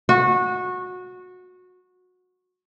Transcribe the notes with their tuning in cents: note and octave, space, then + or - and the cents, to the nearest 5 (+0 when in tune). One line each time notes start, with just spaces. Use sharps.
F#4 -20